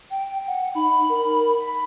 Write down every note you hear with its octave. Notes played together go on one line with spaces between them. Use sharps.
G5
F#5
D#4 B5
A#4
B5